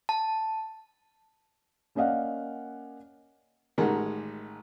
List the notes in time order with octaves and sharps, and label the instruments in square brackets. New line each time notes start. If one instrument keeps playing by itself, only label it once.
[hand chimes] A5
[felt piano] A#3 C#4 D5 D#5 F5 F#5
[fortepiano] A1 D#3 G#3 A#4 F#5